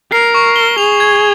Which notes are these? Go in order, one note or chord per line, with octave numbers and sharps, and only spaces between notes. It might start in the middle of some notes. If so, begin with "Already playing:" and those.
A#4 C7
C#6
G7
G#4 F7
G#6